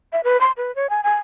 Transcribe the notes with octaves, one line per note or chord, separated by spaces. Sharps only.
E5
B4
C6
B4
C#5
G#5
G#5